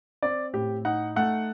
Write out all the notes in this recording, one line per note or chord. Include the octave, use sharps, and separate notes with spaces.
C4 D5
A2 G4
D#4 F#5
A3 F#5